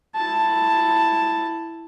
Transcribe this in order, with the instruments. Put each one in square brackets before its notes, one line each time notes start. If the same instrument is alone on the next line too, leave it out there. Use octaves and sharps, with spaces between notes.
[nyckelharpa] E4 A5